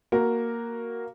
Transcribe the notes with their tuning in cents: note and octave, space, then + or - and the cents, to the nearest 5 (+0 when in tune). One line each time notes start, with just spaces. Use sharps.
A#3 +0 F#4 +0 A#4 +0